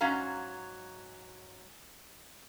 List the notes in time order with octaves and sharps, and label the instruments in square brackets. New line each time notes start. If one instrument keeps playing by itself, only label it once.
[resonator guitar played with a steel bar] G#2 F#3 C#4 F5 A#5